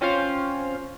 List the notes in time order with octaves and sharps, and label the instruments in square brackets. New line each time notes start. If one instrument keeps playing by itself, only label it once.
[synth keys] C4 C#4 F4 C5 F5